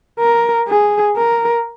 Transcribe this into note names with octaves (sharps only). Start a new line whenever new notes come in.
A#4
G#4
A#4